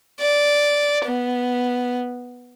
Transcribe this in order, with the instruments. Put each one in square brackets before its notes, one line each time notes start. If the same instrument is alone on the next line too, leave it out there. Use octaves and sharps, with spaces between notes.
[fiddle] D5
B3